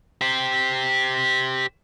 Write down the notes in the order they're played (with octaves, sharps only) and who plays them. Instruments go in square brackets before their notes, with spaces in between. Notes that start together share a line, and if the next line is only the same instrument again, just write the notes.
[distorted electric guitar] G4 C5